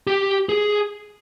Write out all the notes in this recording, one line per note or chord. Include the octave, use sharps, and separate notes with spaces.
G4
G#4